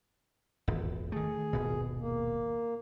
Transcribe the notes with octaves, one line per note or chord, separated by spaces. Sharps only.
D#1 G#1 E2
D#3 A3 G#4
D#1 G#1 B2
A#3